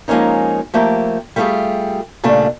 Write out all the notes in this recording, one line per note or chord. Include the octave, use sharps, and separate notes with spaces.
F3 G#3 A#3 C#4 D#4
F3 A3 A#3 G4
G3 A3 B3 F4 G4 G#4
A#2 C#3 G3 A3 D4